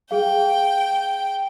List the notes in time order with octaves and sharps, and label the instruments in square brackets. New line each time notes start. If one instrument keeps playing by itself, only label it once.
[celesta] G#4 F5 [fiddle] G5